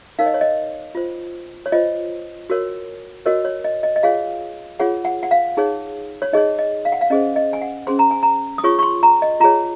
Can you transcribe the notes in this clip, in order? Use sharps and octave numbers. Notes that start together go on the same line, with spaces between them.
D#4 A#4 C#5 F5
D#5
C#5
D#5
F4 C5
C#5
F4 C5 D#5
F#4 A#4 C#5
F#4 A#4 C#5 D#5
C#5
D#5
D#5
D#5
F4 G#4 C#5 F5
F4 G#4 C#5 F#5
F#5
F#5
F5
D#4 G#4 C#5
C#5
D#4 G#4 C#5 D#5
D#5
F5
F#5
F5
C#4 G#4 C5 D#5
D#5
G#5
F#5
C#4 G#4 C5 C6
A#5
G#5
A#5
D#6
F4 G#4 C#5 C#6
C#6
C6
A#5
D#5
F4 G#4 C#5 A#5